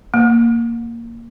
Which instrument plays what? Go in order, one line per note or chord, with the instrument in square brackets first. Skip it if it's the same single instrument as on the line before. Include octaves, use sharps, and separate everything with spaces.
[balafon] A#3